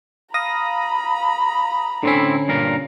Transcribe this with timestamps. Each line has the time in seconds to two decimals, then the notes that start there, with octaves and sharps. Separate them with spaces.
0.34 F5 A#5 B5 D#6 A#6
2.03 A2 D3 C4 C#4 E4
2.48 G2 A#2 A#4